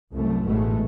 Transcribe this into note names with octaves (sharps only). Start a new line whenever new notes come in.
C2 F#2 A3
A1 G#2 B2 G#3 A3